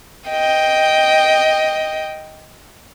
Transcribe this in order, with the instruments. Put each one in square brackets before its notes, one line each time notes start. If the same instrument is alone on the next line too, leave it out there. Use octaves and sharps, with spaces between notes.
[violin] D#5 G5